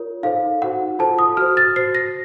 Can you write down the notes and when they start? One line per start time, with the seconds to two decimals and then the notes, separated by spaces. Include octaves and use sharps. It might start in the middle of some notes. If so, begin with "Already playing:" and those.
Already playing: F4 A#4 C#5
0.23 D#4 A4 C5 F5
0.62 D#4 F#4 C5 F#5
0.99 F4 A4 C5 A5
1.19 D#6
1.37 F#4 C5 F6
1.57 A6
1.76 F#4 C5 C7
1.95 A#6